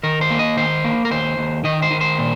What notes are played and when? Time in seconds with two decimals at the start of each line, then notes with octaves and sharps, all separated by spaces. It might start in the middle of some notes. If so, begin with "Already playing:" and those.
0.03 D#3 A#4
0.21 C5
0.30 A#3
0.39 D#5
0.57 D#3 C5
0.84 A#3
1.05 A#4
1.11 D#2 C5
1.38 D#2
1.64 D#3 D#5
1.82 C5
1.91 D#3
2.01 C5
2.18 A#2